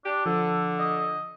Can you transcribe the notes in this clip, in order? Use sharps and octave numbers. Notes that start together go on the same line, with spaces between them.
D4 G4
D3 F3 A4
D#5